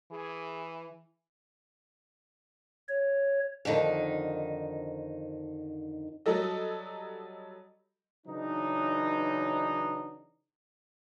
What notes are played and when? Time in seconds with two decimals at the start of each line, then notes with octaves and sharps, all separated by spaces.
0.11 E3 G#4
2.88 C#5
3.65 F2 D3 D#3 D#4
6.26 F#3 G3 A4 D#5
8.26 C#3 E3 F#3 D4 D#4